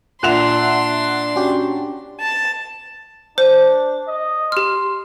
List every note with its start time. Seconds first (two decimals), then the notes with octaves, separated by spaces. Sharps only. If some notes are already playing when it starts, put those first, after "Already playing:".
0.23 A#2 D4 E5 F#5 C6 F#6 E7 F7
1.36 C#4 F#4 G4
2.19 A5
3.38 D4 C5
4.08 D#5
4.52 G4 C6 F6